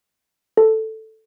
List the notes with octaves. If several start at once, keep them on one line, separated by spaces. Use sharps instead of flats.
A4